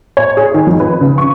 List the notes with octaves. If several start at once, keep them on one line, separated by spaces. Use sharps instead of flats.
C#5
G#4
D#3
F2
B4
C#3
C#6